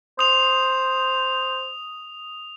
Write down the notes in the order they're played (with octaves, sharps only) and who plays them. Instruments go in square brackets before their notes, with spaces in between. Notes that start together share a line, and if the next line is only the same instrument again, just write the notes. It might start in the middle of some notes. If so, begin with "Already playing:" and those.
[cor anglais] C5 [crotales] D#6 F7